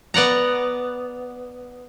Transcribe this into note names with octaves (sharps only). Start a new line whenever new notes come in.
B3 D5 F#5 A#5